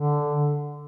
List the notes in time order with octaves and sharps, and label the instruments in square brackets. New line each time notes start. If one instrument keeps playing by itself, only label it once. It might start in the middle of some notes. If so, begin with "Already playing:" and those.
Already playing: [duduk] D3